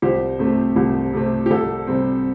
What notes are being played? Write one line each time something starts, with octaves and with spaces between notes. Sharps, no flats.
C2 G4 C5
C3 A3 C4
C2 G4
C3 A3 C4
G4
C2 A4
C3 G3 C4